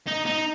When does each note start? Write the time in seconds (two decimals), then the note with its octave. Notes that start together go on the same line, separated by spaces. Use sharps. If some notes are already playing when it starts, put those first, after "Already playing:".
0.08 D#4
0.26 D#4